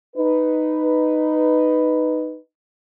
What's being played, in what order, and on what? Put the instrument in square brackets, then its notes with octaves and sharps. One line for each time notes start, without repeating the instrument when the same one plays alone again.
[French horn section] D#4 B4